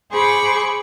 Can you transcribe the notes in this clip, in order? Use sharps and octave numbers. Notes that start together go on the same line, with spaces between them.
G#4 C5 B5 C#6 D6